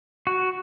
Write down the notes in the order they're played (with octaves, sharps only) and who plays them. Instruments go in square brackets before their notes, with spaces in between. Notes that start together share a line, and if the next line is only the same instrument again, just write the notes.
[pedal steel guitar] F#4